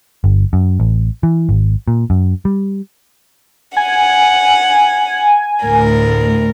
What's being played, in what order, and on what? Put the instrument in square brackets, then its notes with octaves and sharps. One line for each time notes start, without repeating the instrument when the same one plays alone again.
[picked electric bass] G1
F#2
A1
E3
G#1
A#2
F#2
G3
[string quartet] F#5 [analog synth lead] G#5
[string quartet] D2 A2 A#4